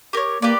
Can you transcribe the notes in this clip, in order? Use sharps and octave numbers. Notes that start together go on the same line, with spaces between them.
G4 A#4 C#5
A#3 G4 B4 D5